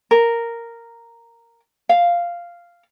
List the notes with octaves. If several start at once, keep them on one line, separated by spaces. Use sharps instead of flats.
A#4
F5